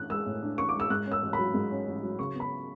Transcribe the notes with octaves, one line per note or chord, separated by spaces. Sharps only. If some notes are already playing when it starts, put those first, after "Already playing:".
Already playing: A1 A2 D4 F#6
G#3 E6
A2
D4
A1 C#6
D6
G#3
E6
G#2 F#6
C#4
E6
A1
B5
F#3
G#2
C#4
A1
F#3
C#3 C#6
B3
B5